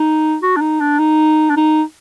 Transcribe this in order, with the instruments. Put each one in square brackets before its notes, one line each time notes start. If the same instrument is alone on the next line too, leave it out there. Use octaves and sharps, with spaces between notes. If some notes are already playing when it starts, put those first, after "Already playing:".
Already playing: [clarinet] D#4
F#4
D4
D#4
D4
D#4
D4
D#4